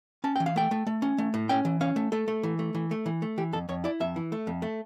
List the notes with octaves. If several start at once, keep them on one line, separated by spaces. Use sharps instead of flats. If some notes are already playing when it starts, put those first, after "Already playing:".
C#4 A5
E3 G5
F5
A3 G5
A3
A3
C#4
A3
A2
C#4 G5
E3
C#4 F5
A3
A3 A4
A3
E3
A3
E3
A3
E3
A3
E3 G4
F2 A4
F2 C#5
E4 D5
F2 E5
E3
A3
F2
A3